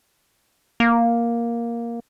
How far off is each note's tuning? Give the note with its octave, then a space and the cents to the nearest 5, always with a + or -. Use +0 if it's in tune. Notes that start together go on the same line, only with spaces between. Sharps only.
A#3 +5